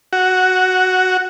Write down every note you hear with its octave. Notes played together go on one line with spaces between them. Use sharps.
F#4